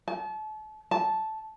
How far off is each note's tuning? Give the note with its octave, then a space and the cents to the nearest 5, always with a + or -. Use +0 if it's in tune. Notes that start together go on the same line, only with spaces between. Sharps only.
A5 -35
A5 -10